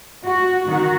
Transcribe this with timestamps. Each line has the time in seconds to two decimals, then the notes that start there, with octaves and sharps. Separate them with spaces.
0.24 F#4
0.67 D#3 F#4